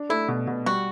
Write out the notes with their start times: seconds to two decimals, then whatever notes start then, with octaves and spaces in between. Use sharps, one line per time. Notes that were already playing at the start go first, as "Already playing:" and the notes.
Already playing: D4
0.09 A3 E4
0.28 B2
0.47 B2
0.66 G3 F#4